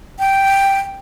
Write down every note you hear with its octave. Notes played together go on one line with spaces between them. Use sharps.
G5